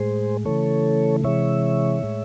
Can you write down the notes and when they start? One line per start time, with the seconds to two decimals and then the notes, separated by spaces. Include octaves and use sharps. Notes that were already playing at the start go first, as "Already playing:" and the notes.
Already playing: A2 G#3 G#4 C5
0.45 C#3 E3 A3 A4 C#5
1.24 C3 E3 G#3 C#5 E5
2.03 A2 G#3